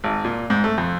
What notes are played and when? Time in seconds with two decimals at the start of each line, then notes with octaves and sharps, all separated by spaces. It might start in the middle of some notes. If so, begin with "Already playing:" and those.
0.04 G#1
0.25 A#2
0.50 G#2
0.64 A3
0.78 F2